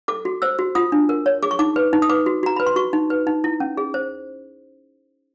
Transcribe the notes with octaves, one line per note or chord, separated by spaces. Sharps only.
A4 D6
F#4
C5 E6
F#4
F4 D#6
D4
A#4
C#5
G#4 D6
C#6
D#4 D6
B4
D#4
D#6
B4 D6
F#4
F#4 A#5
B4 B5
C6
F#4 C#6
D#4
B4
D#4
E4
C#4
G#4
C5